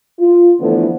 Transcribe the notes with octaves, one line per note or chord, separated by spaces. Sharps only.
F4
D3 E3 F3 A3 B3